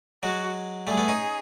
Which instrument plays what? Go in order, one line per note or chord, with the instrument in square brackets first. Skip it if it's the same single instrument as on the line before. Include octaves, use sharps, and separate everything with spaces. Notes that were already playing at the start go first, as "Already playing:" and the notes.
[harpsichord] F#3 G#3 [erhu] F#4
[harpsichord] G3 A3 [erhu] G#4
[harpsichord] A3 B3
C#4 D#4